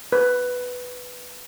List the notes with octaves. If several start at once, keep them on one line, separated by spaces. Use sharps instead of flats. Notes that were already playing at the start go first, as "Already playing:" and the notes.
B4